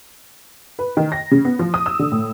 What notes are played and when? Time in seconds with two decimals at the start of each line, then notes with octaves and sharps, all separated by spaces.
0.79 B4
0.97 D#3
1.12 A#6
1.31 C#3
1.45 B3
1.59 F3
1.74 D#6
1.86 E6
1.99 D3
2.12 A2